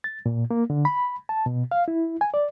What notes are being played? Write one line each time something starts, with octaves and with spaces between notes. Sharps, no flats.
A6
A#2
A#3
D3
B5
A5
B2
F5
E4
G#5
D5